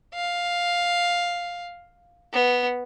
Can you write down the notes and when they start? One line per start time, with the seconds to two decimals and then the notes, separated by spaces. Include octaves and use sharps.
0.14 F5
2.33 B3